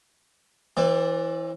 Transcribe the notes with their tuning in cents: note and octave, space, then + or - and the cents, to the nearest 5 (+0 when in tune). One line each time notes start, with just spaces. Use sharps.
E3 -5 C4 +40 D5 +0